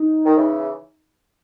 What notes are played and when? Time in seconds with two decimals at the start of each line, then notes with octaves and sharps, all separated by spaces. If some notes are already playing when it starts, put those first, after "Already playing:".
Already playing: D#4
0.26 D#3
0.37 C#3 E3